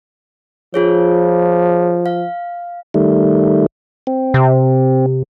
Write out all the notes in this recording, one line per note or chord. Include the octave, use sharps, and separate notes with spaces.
F3 F4 G#4 C#5
F5
D#3 G3 A3
C4
C3